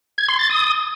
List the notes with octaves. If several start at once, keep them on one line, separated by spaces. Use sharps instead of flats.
G#6
C6
A6
D#6